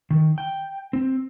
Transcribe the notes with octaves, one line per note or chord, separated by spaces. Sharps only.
D#3
G5
C4